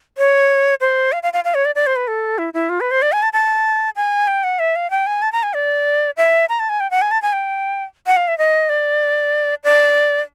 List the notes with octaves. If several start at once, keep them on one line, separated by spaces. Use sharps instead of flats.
C#5
C5
F5
F5
F5
F5
C#5
D5
D5
C5
B4
A4
E4
E4
F4
B4
C5
D5
G#5
A5
A5
G#5
G5
F#5
E5
F5
G5
G#5
A5
A#5
G#5
D5
E5
A#5
A5
G#5
G5
F#5
G#5
A5
G#5
G5
F#5
F5
E5
D#5
D5
D5